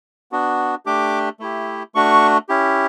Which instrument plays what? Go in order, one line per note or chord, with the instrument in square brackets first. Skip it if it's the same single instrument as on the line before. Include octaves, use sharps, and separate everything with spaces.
[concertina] B3 D4 F#4
A3 D4 G4 D6
A3 E4 G4
A3 D4 F#4 C#6
C#4 E4 G4